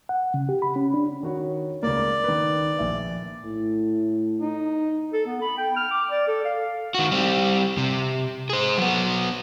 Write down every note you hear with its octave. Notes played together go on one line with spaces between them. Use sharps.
F#5
C#3
G4
B5
C#4
D4
D#3 F#4 C#5
C#2 A#3 D5
D#3 B4
A#1 E5
A2
D#4
A4
B3
B5
G5
F6
D6
D5
A4
F5
D#3 F#4
G3 C4
C3
G#4 C5
F#3 B3